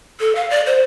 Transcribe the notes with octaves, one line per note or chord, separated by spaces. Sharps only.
A4
F5
D5
C5